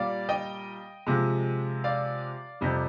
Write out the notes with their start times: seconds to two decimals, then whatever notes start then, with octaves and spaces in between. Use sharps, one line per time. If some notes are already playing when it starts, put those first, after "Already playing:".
Already playing: A#2 G3 D5 F5
0.29 D#5 G5
1.07 C3 F3 G#3
1.84 D5 F5
2.61 F2 C3 G3